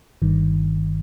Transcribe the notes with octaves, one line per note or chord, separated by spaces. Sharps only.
G1 G2 D#3